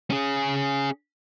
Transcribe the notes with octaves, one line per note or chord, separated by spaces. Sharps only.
C#4 G#4